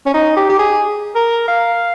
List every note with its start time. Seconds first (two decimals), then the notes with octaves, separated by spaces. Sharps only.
0.06 C#4
0.14 D#4
0.36 G4
0.49 G4
0.59 G#4
1.15 A#4
1.48 F5